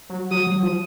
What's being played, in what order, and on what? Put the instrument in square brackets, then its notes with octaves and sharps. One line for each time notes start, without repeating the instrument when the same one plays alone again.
[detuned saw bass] F#3
[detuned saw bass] F#3 [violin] D#6
[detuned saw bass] F#3
F3